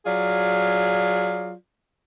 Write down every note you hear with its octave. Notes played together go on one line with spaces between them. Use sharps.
F#3 F4 G#4 D5